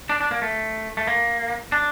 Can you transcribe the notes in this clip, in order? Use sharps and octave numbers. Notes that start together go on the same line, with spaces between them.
D4
D4
A#3
A3
A3
A#3
D4